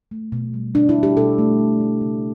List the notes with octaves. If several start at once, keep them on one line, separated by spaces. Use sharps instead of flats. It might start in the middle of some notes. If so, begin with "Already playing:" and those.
A3
B2
G3
B2 D4
E4
G3
G4
B2 A4
A3
B2
A3
C#3